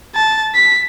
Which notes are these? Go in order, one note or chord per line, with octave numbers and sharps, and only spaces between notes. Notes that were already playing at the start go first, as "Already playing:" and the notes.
A5
B6